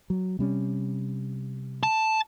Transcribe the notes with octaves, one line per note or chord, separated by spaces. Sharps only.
F#3
C3 G3 C#4
A5